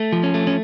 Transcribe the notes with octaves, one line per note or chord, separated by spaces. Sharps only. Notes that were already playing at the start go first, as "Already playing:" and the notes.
Already playing: A3
F3
C#4
A3
C#4